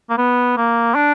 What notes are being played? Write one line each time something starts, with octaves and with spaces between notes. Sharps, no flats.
A#3
B3
A#3
D4